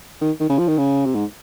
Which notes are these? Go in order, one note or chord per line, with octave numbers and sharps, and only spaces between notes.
D#3
D#3
C#3
F3
D#3
C#3
C3
G#2